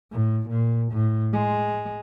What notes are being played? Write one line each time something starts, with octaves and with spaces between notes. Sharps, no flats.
A2
A#2
A2
G#3